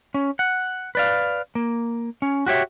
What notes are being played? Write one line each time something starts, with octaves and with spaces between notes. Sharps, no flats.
C#4
F#5
B4 D5 F5
A#3
C#4
F#4 G4 C#5 E5